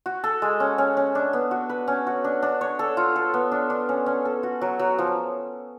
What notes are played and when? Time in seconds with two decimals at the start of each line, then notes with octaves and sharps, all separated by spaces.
0.06 F#4
0.24 A4
0.42 G#3
0.60 C#4
0.78 C#4
0.97 C#4
1.15 D4
1.33 B3
1.51 F#4
1.69 B4
1.88 C#4
2.07 F#4
2.24 D4
2.42 D4
2.61 C#5
2.79 A4
2.97 F4
3.16 A4
3.34 B3
3.52 D4
3.70 D4
3.89 C#4
4.06 C#4
4.25 A4
4.43 F#4
4.61 F#3
4.79 F#3
4.98 F3